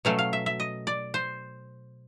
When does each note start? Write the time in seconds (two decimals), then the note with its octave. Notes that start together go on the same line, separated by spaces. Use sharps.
0.05 B2 F#3 A3 C#4 F5
0.19 F5
0.33 E5
0.46 E5
0.60 D#5
0.87 D5
1.14 C5